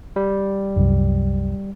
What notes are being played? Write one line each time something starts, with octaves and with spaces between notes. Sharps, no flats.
G3
C2 F#2